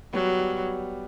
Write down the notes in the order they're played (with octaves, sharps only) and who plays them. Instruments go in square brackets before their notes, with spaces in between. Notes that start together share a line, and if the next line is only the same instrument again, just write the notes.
[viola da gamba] F#3 [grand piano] G3 B3
[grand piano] G3